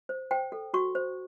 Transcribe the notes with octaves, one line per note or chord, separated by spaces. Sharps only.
C5
C5 G5
A4
F#4 C#6
C5